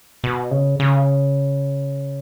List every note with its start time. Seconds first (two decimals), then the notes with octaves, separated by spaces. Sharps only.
0.24 B2
0.51 C#3
0.80 C#3